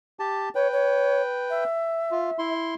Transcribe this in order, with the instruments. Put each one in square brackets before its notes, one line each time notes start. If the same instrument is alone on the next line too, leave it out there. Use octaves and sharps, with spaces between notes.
[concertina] G4 A5
[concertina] B4 G5 [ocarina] C#5
[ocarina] C#5
E5
[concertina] F4
E4 C6